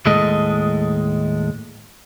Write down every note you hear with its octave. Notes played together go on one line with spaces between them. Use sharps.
D#2 A2 G#3 A4 D#5